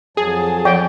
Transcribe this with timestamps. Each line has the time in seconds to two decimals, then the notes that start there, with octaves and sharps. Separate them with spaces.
0.17 F2 F#3 G#4 A5
0.65 F3 C#5 F#5 G5